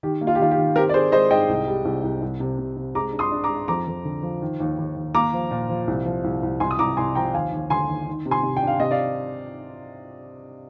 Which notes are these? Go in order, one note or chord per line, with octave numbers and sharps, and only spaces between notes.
D#3 G4
A#3
F4
G4
D#3 F4
G4
D#3
C4 G4 A#4
D5
C4 G#4 C5
G#3 C5 D#5
G#2 D#5 G5
C2
G3
C2
C2
C2
C3
C3
C3
G#3 A#5 D6
D4
C6 D#6
D4
A#5 D6
G#3
F2 A#5 D6
F2
D3
F3
D#3
D#2
D#2
D#2
A#3 A#5 D6
F3
A#2
F3
C2
F3
C2
C2
C2 G#5 C6
D#6
C2 A#5 D6
C2 G#5 C6
F3 G5 A#5
D#2 F5 G#5
D#2
D3 G#5 C6
D#2
D#3
C3
G#5 C6
C3
G5
D4
F5
C3 D#5
D5 F5